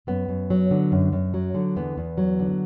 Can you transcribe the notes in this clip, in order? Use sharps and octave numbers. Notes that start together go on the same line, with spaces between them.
F#2 B3
F#2
F#3
D3
F#2
F#2
F#3
D3
E2 B3
E2
F#3
D3